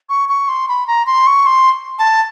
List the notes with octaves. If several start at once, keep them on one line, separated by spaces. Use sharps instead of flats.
C#6
C#6
C6
B5
A#5
C6
C#6
C6
A5